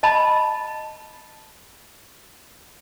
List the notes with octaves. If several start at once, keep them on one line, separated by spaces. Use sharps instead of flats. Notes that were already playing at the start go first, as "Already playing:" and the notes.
D#5 A5 B5